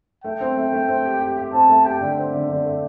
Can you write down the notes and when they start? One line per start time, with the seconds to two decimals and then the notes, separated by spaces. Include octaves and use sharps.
0.24 A3 G5
0.40 C4
0.57 A3
0.73 A3
0.88 C4
1.05 G4
1.20 G4
1.37 G4
1.53 C4 A5
1.69 A3
1.84 G4 G5
2.01 D3
2.18 C4
2.33 D3
2.50 D3
2.65 A3